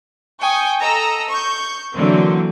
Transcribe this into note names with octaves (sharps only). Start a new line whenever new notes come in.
G5 G#5 C#6 D#6
A4 D#5 A#5 E6
C#6 G6
D3 E3 F#3 A#3 C4